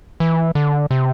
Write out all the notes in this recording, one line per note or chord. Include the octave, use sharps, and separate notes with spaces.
E3
D3
C3